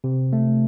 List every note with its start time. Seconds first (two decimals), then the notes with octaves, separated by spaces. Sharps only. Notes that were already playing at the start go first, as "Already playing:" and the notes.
0.04 C3
0.33 A3